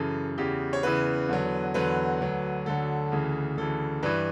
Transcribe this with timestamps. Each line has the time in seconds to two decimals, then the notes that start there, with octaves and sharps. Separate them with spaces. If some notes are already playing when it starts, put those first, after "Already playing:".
Already playing: F#2 C#3 E3 A4
0.38 E2 C#3 E3 G4
0.73 C#5
0.83 E2 C#3 E3 B4
1.29 E2 D3 F#3
1.74 E2 D3 F#3 B4
2.21 D2 D3 F#3
2.66 D2 D3 F#3 A4
3.12 D2 C#3 E3
3.57 D2 C#3 E3 A4
4.03 G2 E3 B4